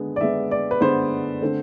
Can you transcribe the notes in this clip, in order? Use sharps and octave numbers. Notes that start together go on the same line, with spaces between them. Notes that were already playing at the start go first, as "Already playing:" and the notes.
Already playing: D3 G#3 B3
D5
D3 G#3 B3 E5
D5
B4
D3 G#3 B3 C5
D3 A3 C4